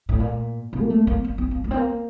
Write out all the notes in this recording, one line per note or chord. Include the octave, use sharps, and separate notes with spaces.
A2
A#2
C3
A#3
A3
A#3
A#3
C4
A#3
A3
C4
A#3